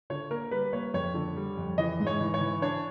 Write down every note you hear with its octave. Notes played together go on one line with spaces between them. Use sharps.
D3 C#5
A#3 A#4
G3 B4
A#3 C#5
F2 C#5
D3
G3
F2
E3 D#5
G#2
C#5
E3
C#5
E3
D4 C#5